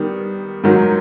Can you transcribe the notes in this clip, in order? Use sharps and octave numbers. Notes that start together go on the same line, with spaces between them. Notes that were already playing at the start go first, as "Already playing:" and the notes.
Already playing: D#3 G3 B3
G#2 D#3 F#3